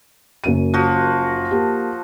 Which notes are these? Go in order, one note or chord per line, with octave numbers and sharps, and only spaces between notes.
F#1 F#2 D#7
F3 F#4
A#3 G4